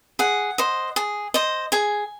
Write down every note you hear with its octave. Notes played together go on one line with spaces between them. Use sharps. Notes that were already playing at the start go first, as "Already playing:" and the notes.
G#4 F#5
C5 D#5
G#4
C5 D#5
G#4 G#5